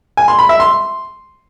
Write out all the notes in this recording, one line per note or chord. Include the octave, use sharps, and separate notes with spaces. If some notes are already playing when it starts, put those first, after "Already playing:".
G#5
C6
B5
E5
C6